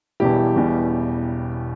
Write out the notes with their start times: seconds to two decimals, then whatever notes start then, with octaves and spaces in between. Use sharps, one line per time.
0.20 E1 E2 B2 G3 E4 G4
0.56 E1 E2 B2 G3